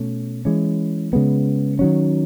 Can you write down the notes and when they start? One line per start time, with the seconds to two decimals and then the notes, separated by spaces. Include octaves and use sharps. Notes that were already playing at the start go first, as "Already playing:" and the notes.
Already playing: B2 A3 C#4
0.45 E3 G#3 C#4
1.13 C#3 G#3 B3
1.79 D#3 F#3 C#4